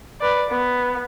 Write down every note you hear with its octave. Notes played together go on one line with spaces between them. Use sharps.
B4 D5
B3